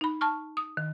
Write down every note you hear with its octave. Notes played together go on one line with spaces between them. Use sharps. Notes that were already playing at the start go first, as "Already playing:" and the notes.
D#4 B5
A5 C#6 F6
D#6
D#3